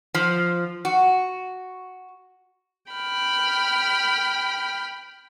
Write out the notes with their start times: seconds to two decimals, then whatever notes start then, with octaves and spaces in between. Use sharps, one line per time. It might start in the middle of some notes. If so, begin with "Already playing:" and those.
0.14 F3
0.85 F#4
2.91 G5 B5 F6